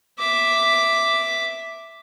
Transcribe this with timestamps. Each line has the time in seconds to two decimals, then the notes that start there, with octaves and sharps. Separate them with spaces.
0.19 E5 D6